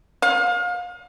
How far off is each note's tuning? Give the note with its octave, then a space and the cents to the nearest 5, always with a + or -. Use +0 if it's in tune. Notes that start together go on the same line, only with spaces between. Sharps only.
F5 +30